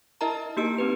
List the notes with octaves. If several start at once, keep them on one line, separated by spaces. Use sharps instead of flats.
E4 A#4 D#5 E5 A5 A#5
A#3 D#4 G4 E6 D7
C4 G4 B4